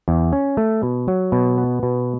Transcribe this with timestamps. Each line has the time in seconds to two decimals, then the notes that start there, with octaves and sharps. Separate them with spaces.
0.08 E2
0.33 C#4
0.57 A3
0.83 B2
1.08 F#3
1.32 B2
1.58 B3
1.83 B2